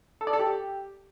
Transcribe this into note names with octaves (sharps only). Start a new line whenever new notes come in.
A4
D5
A4
G4